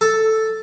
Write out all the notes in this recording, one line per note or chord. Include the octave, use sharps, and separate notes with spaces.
A4